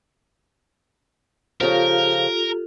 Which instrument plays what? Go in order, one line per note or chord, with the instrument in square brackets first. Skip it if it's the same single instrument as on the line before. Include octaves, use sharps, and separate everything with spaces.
[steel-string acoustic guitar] C#3 F3 [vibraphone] F4 G4 A4 [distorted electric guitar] A#4